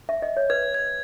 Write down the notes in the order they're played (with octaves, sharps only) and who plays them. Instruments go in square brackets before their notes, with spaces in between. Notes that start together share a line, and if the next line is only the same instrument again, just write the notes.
[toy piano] E5
D#5
C#5
[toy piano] B4 [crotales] G#6
[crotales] G#6